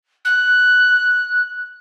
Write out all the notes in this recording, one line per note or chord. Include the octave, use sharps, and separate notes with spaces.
F#6